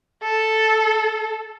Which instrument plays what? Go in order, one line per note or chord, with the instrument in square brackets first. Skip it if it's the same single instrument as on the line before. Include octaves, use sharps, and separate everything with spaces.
[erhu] A4